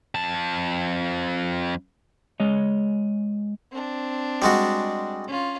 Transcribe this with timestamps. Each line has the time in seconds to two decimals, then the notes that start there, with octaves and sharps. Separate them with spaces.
0.15 F2 A5
2.40 G#3 C#5 D#5
3.71 C4 D4
4.42 G3 G#3 F#4
5.28 C#4 F4